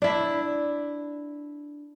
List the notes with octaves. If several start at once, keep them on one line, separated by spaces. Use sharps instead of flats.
D4 E4